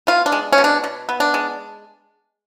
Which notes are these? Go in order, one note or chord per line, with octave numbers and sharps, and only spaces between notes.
B3 F4
D4
G#3
C#4
B2
D4
B2
B3
D4
G#3